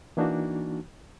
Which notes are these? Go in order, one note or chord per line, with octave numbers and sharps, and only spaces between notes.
E3 A#3 D4 D#4 F#4